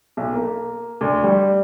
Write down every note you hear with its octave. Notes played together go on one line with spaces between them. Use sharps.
B1
A#3
D2
G3